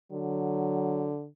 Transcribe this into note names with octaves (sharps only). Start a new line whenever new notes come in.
D3 F#3